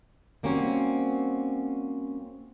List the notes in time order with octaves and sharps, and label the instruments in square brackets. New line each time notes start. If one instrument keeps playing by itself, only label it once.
[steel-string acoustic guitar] G3 A#3 C4 C#4 F#4